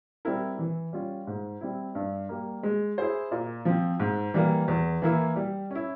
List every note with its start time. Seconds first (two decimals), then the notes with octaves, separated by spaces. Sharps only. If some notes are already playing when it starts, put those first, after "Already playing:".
0.25 G3 C4 E4 A#4
0.59 E3
0.93 G3 C#4 F4
1.27 G#2
1.61 G3 C4 E4
1.95 G2
2.29 G3 A#3
2.63 G#3
2.98 E4 G#4 C5
3.31 A#2
3.65 F3 C4
4.00 G#2
4.34 E3 G3 A#3
4.68 E2
5.02 E3 A#3 E4
5.36 G3
5.70 C#4 E4